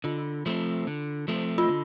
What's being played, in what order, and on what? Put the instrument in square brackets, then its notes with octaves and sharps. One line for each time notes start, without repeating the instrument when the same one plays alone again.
[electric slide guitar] D3 [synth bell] F4
[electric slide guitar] F3 A3 C4
D3
F3 A3 C4
[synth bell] F4
[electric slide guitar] D3